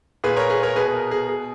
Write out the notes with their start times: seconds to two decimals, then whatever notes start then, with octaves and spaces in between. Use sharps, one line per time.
0.24 A#2 G#4 B4
0.36 A#4 C#5
0.50 G#4 B4
0.63 A#4 C#5
0.75 B2 G#4 B4
0.87 B4
0.94 A#4
1.11 G#4
1.29 B2 G#4